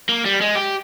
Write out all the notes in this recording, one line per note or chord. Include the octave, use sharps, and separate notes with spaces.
A#3
G3
G#3
G4